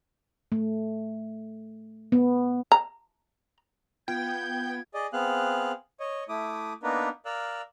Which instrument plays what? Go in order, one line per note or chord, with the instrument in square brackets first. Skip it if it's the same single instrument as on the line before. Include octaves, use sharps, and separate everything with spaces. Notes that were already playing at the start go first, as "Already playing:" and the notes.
[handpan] A3
B3
[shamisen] A#5
[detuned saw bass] B3 [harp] F4 [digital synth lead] G5 [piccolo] G#6
[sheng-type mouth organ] G#4 D5 D#5
B3 C4 G#4 F5 F#6
C#5 D#5
A3 E4 D6 D#6
A#3 B3 D4 D#4 A#4 B4
A#4 D5 F5 E6 F#6